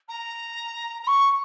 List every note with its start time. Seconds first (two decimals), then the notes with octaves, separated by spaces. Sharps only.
0.08 A#5
1.03 A#5
1.07 C#6